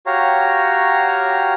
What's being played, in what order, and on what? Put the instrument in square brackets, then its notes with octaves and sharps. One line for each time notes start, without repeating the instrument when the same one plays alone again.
[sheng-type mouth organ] F#4 G4 C#5 F5 A#5